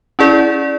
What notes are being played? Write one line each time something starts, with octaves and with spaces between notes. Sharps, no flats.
C#4 E4 G#4 D5